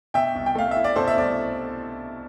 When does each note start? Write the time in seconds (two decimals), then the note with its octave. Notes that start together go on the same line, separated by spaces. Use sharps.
0.14 B2 E5 G5
0.35 C2
0.46 G5
0.55 A3 F5
0.71 E5
0.76 E4
0.84 D5
0.96 B2 A4 C5
1.07 E5
1.16 C2 D5